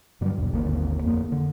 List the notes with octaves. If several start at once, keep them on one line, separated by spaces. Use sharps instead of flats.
G2 D3 F#3 G3
A#1 E2 B2
G#1 D#2 D3 A#3
F2 A#3
D3